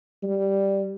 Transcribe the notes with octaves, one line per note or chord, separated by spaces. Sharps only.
G3